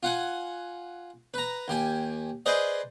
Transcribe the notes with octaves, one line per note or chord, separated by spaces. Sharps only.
F4 F#5 G#5
B4 A#5
D#2 G4 G#5
G#4 B4 C5 D5 D#5